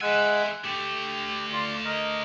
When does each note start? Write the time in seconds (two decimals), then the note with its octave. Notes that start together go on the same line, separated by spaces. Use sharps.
0.01 G#3 E5 F#5 G#5 E6
0.64 D3 A3 G4
1.53 F4 D5 C6
1.85 A#4 D#5